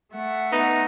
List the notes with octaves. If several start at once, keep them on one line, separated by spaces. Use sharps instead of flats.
A3 E5 F#5
B3 D#4